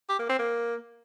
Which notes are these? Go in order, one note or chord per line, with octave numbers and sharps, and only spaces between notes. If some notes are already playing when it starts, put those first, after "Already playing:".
G4
A#3
C4
A#3